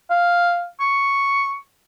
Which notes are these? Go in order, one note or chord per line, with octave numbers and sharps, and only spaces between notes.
F5
C#6